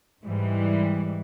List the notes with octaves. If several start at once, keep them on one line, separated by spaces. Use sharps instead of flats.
G#2 E3 G3